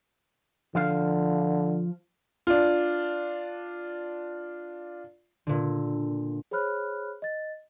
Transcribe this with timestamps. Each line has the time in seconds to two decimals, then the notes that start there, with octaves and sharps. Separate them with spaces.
0.75 D3 F3 F4 F5
2.47 D4 F4
5.47 A#2 D3
6.51 G#4 C5 C#5 B5 F6 F#6
7.22 D#5 A6